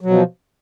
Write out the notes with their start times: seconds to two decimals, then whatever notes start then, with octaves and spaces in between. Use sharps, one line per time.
0.01 F#3
0.06 B2
0.10 F3